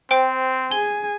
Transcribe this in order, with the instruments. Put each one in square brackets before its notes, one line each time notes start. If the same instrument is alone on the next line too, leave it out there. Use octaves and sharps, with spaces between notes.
[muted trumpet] C4 [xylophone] C5 G5 D7
[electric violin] G#4 G#5 [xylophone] G7